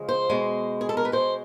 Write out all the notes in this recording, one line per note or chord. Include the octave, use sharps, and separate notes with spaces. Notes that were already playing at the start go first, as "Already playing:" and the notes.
Already playing: C#3 F3 G#3
C5
B2 G#3
G#4
A4
A#4
B4
B2 G#3 C5